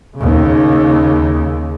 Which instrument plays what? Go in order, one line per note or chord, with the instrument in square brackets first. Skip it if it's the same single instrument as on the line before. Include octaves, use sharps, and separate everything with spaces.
[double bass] D#2 C#3